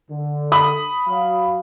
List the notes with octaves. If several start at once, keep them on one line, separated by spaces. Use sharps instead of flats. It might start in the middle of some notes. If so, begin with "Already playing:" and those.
D3
B5 D#6
F#3 F5